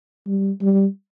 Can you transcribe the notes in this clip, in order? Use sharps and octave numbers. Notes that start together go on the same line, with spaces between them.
G3
G3